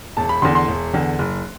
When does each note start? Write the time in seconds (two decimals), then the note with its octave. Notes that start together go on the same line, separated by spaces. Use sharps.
0.17 E1 A5
0.29 B5
0.42 E2 D3 C6
0.55 C6
0.68 E1
0.93 E2 D3
1.19 F#1